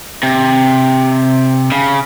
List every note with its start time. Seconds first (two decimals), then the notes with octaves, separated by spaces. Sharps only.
0.23 C3
1.72 C#3